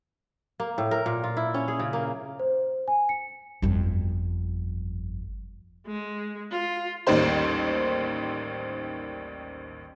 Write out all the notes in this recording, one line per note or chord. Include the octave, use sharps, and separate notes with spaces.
A#3
A2
A#4
A#2
F4
E4
C#4
G#4
C#3
A#3
C5
G#5
C#7
G1 F2
G#3
F4
A1 D#2 D#3 G3 C5 C6